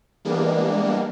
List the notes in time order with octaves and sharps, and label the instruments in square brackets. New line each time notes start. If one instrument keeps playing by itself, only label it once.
[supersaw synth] E3 G3 G#3 A#3 B3 D4